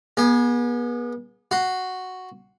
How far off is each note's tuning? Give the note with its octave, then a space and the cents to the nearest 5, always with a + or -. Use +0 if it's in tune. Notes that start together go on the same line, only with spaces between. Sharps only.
B3 -35 G#4 +0
F#4 +0 C6 +0